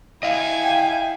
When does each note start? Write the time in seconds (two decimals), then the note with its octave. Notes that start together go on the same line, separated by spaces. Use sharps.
0.23 E4 D#5 F5 G#5
0.63 G5